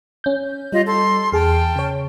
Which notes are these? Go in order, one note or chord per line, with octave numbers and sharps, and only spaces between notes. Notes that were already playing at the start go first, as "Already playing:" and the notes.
C#4 G6
G3 F4 D#5
A4 C6
E2 G#4 G5 A5 F6
C#3 C#5